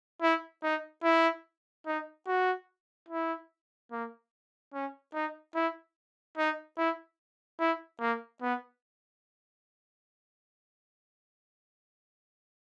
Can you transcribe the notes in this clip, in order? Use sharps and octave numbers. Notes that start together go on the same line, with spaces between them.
E4
D#4
E4
D#4
F#4
E4
A#3
C#4
D#4
E4
D#4
E4
E4
A#3
B3